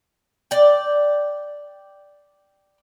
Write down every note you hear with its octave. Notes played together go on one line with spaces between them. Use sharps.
D5 G5